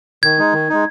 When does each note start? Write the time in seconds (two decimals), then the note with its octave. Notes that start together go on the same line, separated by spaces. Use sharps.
0.23 D#3 G#6
0.39 G#3 D#4
0.53 D#3
0.69 G#3 D#4